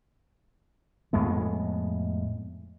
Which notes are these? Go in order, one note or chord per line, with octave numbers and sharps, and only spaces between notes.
F2 A2 G#3 B3